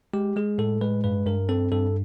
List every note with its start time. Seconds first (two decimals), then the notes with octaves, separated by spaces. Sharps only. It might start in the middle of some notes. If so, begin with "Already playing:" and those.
0.13 G#3 G4
0.36 G#3 G#4
0.58 A2 A4
0.81 G#3 B4
1.04 G2 B4
1.26 G2 A#4
1.49 C4 A4
1.72 G2 A4